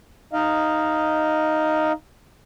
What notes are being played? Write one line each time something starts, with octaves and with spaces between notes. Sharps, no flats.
D#4 D#5 F5